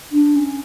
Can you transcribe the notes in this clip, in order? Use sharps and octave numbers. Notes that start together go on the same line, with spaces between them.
D4
C#4